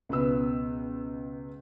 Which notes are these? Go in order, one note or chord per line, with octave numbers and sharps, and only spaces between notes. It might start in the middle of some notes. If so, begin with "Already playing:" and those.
C#2 B2 B4 E6